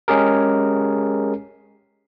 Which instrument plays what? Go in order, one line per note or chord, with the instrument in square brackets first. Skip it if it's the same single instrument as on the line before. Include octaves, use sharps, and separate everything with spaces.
[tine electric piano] G#3 C#4 G4 G#4 A#4